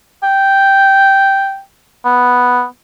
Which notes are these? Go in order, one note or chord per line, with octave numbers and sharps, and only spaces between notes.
G5
B3